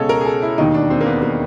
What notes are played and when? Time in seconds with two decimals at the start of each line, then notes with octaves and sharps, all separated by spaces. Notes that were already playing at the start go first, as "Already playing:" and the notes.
Already playing: C#2 B2 G#3 A4 C#5 D#5
0.09 A#4
0.21 G#4
0.26 A4
0.42 E4
0.58 E1 D#2 D#3 D#4
0.74 D4
0.90 C4
1.01 A#3
1.06 B3
1.23 A#3